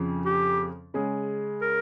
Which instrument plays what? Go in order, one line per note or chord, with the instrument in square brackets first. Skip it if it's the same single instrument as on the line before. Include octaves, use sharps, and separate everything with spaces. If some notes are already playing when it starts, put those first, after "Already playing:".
Already playing: [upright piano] F2 C#3 F3
[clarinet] G4
[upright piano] C#3 G#3 C#4 G#4
[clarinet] A#4